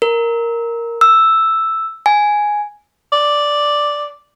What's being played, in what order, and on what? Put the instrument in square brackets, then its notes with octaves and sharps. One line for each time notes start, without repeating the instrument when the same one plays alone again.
[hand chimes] A#4
E6
G#5
[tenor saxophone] D5